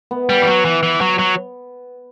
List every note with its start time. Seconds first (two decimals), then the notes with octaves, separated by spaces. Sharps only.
0.11 B3
0.29 G3
0.42 E3
0.47 F#3
0.65 E3
0.83 E3
1.01 F#3
1.19 F#3